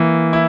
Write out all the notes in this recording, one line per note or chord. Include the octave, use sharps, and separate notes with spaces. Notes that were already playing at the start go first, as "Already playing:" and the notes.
Already playing: E3 A#3
E4